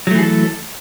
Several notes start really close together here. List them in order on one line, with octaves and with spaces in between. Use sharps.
F#3 A3 E3 G#4 A4